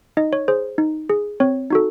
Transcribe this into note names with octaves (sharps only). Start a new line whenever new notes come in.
D#4 D#5
C#5
G#4 C5
D#4
G#4
C4 C#5
D#4 F#4 A4